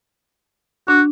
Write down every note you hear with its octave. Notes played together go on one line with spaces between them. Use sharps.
D4 F#4